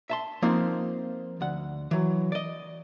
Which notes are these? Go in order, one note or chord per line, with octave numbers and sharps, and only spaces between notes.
E5 A5 C6
F3 A#3 C4 D#4 F4
D2 F#5
E3 F#3
D5 D#5